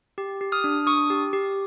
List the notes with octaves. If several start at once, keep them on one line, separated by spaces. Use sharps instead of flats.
G4
G4
D#6 F6
D4
D4 C#6 D#6
G4
G4